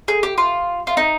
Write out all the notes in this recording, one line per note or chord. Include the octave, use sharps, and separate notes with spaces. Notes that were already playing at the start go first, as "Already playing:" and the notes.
G#4
G4
F4
F4
D#4